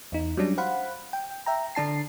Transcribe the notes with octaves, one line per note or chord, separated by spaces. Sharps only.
E2 D#4
F#3 G3 C#4 D4
C5 F5 F#5 B5
G5
E5 G5 A#5
D3 D4 A5 C7